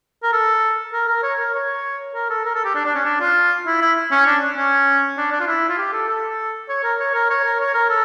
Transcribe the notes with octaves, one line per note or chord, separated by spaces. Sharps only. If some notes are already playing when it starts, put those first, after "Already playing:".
A#4
A4
A#4
A#4
C#5
A#4
C#5
A#4
A4
A#4
A4
G4
D4
D4
C#4
D4
F4
E4
E4
C#4
D4
C#4
D4
D4
F4
E4
F4
G4
A4
A4
C#5
A#4
C#5
A#4
C#5
A#4
C#5
A#4
A4